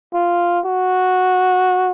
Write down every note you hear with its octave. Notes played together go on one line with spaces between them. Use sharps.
F4
F#4